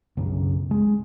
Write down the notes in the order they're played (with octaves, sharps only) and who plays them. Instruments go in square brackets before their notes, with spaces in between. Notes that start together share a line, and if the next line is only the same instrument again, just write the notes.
[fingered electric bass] B1 F#2 C#3
G#3